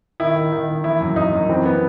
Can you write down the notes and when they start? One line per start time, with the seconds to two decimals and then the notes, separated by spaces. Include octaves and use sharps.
0.20 D#3 E4
0.36 D#3
0.52 D#3
0.68 D#3
0.84 E3 E4
1.00 F#2
1.16 F#2 D#4
1.33 F#2
1.49 E3 C4
1.66 B3